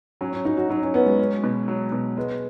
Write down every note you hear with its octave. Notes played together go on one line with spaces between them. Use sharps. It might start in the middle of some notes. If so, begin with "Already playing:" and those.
F#3 C#4
C#4
F#3 D#4
F#4
F#3 D#4
C#4
B3 C#4
G#3
C#4
B2
F#3
B2
G#3 B3